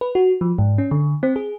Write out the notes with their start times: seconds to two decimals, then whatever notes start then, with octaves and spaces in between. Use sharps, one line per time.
0.01 B4
0.15 F#4
0.41 F3
0.58 G#2
0.78 C#4
0.91 D3
1.23 C4
1.36 G#4